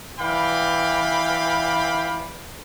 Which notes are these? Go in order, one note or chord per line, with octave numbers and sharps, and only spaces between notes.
E3 D5 F5 G5 B5